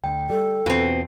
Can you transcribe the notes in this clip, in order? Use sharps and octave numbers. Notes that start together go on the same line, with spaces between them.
D2 G5
G3 A4
E2 B2 C4 F4